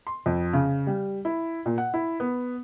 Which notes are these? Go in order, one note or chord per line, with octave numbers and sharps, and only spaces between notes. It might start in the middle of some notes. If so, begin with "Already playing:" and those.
C6
F2
C#3
G3
E4
A#2
F#5
E4
B3